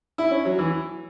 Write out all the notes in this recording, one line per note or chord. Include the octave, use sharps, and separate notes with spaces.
E4
C#4
F#3
E3